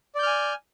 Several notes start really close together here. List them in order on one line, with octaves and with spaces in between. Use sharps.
D5 G6 F6 G#5